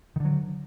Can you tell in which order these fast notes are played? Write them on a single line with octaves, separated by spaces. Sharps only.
D#3 D3 F#3